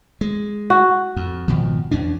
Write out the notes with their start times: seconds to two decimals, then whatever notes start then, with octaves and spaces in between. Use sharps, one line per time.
0.21 G#3
0.70 F#4
1.16 F2
1.48 G#1 B2 F3
1.91 E2 C#4 D4